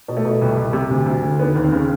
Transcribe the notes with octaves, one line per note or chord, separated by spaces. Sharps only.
B2
A3
B2
C2
C2
C3
D2
D2
D3
D#2 B3
D#2
C4
C#3